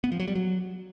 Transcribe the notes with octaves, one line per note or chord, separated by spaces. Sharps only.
B3
F3
F#3
G3
F#3